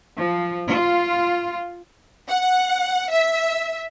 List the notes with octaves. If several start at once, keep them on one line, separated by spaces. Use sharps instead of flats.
F3
F4
F#5
E5